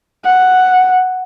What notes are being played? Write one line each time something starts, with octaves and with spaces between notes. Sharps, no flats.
F#5